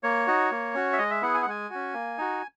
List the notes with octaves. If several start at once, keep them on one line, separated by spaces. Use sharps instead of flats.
A#3 C#5
D#4 F#4
A#3
C#4 F#4
E5
G#3 D#5
E5
B3 E4 G#4 F#5
G#5
F#5
G#3 G#5
F#4
C#4
A#3
D#4 F#4